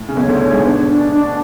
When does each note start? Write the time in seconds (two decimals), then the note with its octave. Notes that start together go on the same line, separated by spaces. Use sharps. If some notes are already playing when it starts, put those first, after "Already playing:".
Already playing: A2
0.09 C#3
0.16 B1 B2 C#5
0.28 D2 D3
0.41 C#5
0.52 G#2 G#3
0.64 B2 B3 D4
0.89 D4
1.13 D4